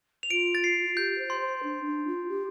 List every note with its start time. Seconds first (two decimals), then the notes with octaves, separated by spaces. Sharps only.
0.23 F7
0.31 F4 D7
0.55 A6
0.64 C7
0.86 F4
0.97 G4 G6
1.18 C5
1.30 C6
1.40 C5
1.63 D4
1.85 D4
2.07 F4
2.28 G4